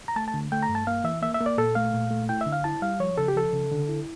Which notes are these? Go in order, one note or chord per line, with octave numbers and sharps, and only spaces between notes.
A#5
A3 A5
A5
D3
A3 G5
A#5
G2
A5
A#3 F5
E3 E5
A#3 E5
E5
A#3
D5
A#2 A4
A3 F5
A#2
A3
E4 G5
E5
D3
F5
E4 A5
G3 F5
F3 C#5
C#3 A4
G4
F3 A4
C#3
D3
E4